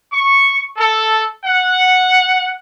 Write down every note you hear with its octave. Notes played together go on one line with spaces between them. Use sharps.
C#6
A4
F#5